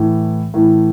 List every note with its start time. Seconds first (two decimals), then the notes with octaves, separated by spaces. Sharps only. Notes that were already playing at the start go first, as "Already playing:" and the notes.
Already playing: A2 E3
0.54 A2 E3